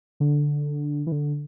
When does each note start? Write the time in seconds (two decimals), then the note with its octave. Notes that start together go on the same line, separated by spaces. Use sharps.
0.20 D3
1.07 E3
1.12 D3